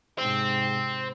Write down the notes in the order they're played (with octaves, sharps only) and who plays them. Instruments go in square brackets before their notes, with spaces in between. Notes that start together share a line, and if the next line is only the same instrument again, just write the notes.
[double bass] G#2 C3 [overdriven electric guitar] C4